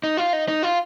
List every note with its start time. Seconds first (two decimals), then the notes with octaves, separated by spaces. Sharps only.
0.04 D#4
0.17 F4
0.33 D#4
0.48 D#4
0.63 F4